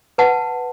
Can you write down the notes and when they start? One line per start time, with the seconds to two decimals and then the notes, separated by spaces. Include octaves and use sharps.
0.18 B4 F#5 A5